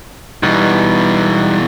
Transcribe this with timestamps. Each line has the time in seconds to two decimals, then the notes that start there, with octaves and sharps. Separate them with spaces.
0.43 B2 E3 G3 B3 D#4